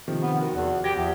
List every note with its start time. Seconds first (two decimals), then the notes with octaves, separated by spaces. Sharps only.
0.08 C3 D#3 F3
0.22 B3
0.41 D#3 F#4
0.55 E2
0.84 G4 G#6 A#6
0.96 E2 F3 E5